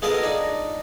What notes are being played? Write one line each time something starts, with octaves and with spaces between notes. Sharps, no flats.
G#3 B3 F4 A4 A#4 D#5
D4 D#4